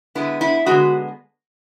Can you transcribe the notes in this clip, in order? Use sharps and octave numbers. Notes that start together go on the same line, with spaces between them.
D3 G#3 B3 E4
E4
D3 G#3 B3 F#4